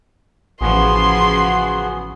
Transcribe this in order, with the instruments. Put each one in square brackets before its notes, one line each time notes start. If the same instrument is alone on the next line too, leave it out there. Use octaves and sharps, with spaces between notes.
[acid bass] A1 [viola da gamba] C#3 F3 F#3 [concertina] B3 F#4 G#4 [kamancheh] C6